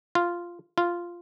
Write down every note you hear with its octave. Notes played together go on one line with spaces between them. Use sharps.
F4
F4